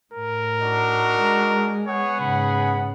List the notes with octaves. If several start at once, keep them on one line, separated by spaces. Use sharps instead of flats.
A2 A#4
D4 D#4 F#4
G#3
B3 G#4 C#5 F#5
G#2 C#3 B5